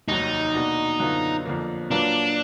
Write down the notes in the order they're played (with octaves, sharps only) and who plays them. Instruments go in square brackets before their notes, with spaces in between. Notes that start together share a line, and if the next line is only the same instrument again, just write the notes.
[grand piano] F1 D#2 D#3 F#3 [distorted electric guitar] D#4
[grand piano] B2 A#3 D4 F#4
F#2 D3 F#3 B3 F4
F2 D3 F3 A#3
[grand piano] A#2 F#3 A#3 F4 B4 [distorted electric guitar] D4